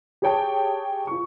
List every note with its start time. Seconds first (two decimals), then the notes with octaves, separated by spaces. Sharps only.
0.22 G4 G#4 C#5 G5 A5
1.07 F4 C#6